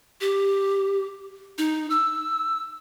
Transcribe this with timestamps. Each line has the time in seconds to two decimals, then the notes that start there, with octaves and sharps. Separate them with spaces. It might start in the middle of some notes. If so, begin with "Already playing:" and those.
0.21 G4
1.58 D#4
1.90 E6